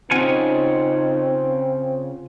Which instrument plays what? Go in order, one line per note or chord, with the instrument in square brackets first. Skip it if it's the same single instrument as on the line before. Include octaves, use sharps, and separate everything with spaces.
[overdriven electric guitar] C#3 D4 [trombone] C4 [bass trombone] D#4 [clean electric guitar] F4 F#5 G#5